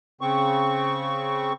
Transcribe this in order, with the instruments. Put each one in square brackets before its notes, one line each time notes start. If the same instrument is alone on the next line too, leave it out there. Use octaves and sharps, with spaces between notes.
[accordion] C#3 C4 C#6